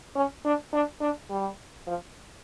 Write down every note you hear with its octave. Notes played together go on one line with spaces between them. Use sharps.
C#4
D4
D4
D4
G3
F3